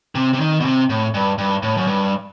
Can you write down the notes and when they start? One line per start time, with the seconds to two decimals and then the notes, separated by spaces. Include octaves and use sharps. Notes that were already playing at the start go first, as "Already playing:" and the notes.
0.15 C3
0.33 C3
0.40 D#3
0.60 B2
0.65 C3
0.90 A2
1.14 G2
1.38 G2
1.63 A2
1.77 F#2
1.87 G2